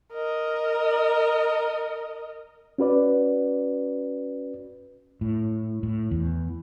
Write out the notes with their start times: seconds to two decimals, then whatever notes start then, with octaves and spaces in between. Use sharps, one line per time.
0.13 A#4 D#5
2.78 C#4 F#4 B4 D5
5.21 A2
5.83 A2
6.11 E2